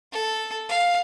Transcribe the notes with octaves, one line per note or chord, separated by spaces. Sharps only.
A4
F5